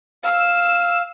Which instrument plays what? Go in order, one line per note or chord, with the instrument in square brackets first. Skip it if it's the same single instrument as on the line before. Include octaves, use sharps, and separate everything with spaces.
[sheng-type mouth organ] F5 [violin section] E6